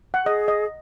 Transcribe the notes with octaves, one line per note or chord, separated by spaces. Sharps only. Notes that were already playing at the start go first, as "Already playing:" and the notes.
F#5
G#4 D#5
D#5